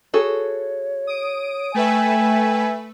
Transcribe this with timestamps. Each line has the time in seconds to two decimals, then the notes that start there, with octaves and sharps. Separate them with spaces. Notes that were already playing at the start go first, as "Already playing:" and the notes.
0.14 F#4 G#4 A4 C#5
1.07 D#6 D7
1.74 A3 B4 E5 G5 G#5